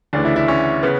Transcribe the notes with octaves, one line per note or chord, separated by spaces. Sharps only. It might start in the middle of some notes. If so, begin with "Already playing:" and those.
D2 C#3 E3 D4
E4
E4
C#4
C#3 B3